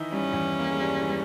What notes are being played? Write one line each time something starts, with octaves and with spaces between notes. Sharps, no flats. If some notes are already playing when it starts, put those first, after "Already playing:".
Already playing: D#3 E3 D#4 E4
G2 G3 C#4
E2 E3
A#3
G#3
G2 G3
E3
G3